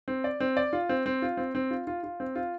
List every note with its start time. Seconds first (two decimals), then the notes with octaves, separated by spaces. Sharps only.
0.08 C4
0.24 D5
0.40 C4
0.57 D5
0.73 F4
0.89 C4
1.06 C4
1.22 F4
1.37 C4
1.55 C4
1.71 F4
1.87 F4
2.03 F4
2.20 C4
2.35 F4